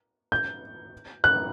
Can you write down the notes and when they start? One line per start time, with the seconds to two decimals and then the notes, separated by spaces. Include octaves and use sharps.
0.32 G6
1.24 F#6